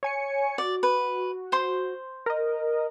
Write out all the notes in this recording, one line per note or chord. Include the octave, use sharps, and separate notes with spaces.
C#5 G#5 C#7
F#4 D5
B4
C5 C6
A#4 D#5